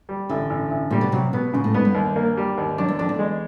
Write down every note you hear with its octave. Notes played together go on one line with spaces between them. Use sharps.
G3
A1 D3
A1
A1
A#2 G3
B2
C3 F#3
B2 B3
A#2 C#3
A2
G#2 B3
G2
D#2
A#3
G3
D#2
F#2 D4
E2
F2 D4
E2
G#3